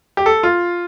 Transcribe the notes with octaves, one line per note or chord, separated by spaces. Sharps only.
G4
A4
F4